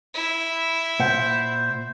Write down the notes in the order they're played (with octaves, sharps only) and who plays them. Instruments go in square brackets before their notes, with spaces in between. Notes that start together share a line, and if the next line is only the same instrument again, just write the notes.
[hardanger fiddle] E4
[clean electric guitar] A#2 F#5 [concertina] C5